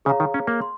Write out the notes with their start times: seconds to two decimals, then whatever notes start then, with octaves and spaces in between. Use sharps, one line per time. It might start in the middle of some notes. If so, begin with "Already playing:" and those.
0.05 C#3 G#4 C#5 F5 A#5
0.20 D#3
0.34 C#4
0.47 A#3
0.62 C6